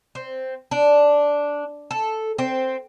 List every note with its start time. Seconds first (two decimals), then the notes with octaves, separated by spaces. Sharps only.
0.15 C4
0.71 D4
1.91 A4
2.38 C4